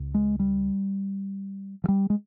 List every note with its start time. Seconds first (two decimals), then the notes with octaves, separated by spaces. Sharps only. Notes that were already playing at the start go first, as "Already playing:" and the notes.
Already playing: C#2 C#3
0.14 G#3
0.39 G3
1.84 F3
1.88 G3
2.10 G#3